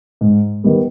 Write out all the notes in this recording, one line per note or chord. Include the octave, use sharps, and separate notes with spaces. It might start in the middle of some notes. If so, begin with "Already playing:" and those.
G#2
D#3 G3 B3